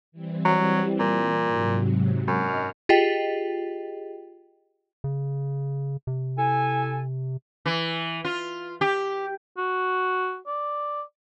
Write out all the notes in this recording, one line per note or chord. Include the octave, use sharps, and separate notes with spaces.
E3 G3 C4
F#3
A#2
G#2 C3 F#3
F#2 D#5 F6
F4 G4 G#4 D#5 G5
C#3
C3
E4 A4 G#5
E3
F4
G4
F#4
D5